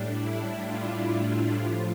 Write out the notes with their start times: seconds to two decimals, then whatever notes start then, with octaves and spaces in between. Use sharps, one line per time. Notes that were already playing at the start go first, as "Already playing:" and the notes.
Already playing: A2 G3 D4
0.21 E4
0.65 F4
1.54 A2 F3